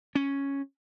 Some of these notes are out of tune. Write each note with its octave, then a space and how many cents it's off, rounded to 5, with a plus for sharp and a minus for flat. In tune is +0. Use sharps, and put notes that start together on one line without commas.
C#4 +0